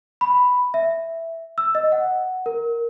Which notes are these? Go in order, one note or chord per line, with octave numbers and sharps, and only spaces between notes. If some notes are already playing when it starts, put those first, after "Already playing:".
B5
E5
E6
D#5
F#5
A#4